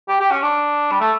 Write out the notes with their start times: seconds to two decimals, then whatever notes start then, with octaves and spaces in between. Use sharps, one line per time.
0.08 G4
0.20 G4
0.31 C#4
0.42 D4
0.91 G3
1.00 A3